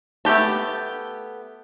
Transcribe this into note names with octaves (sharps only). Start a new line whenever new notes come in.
A3 B3 G4 A5